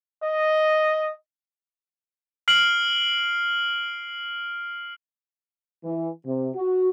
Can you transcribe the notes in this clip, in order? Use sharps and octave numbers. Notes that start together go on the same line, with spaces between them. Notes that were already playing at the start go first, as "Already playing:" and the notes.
D#5
F6 C7 D7 F#7
E3
C3
F#4